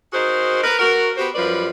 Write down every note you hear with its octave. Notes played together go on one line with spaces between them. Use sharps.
D#4 F#4 G#4 A#4 C5
A#4 B4
F#4 A#4
B3 F#4 G4 C5
F#2 F3 G3 B4 C5 D5